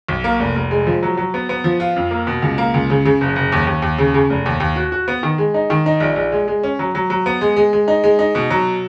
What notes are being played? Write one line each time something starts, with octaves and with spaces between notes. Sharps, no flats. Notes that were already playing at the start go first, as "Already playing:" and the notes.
B1
A#3
F1
F1
G#3
F3
F#3
F#3
B3
B3
F3
F4
F2
A#3
B2
C#2
A#3
C#2
C#3
C#3
F#1
F#1
D#2
D#2
D#2
C#3
C#3
F1
D#2
D#2
F#4
F#4
B3
D#3
G#3
D#4
D#3
D#4
A#1
A#1
G#3
G#3
C#4
F#3
F#3
F#3
B3
G#3
G#3
G#3
D#4
G#3
D#4
B2
F#3